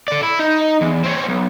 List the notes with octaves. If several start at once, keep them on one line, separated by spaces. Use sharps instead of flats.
A4 D5
E4
D#4
E2
C4 C#4
B1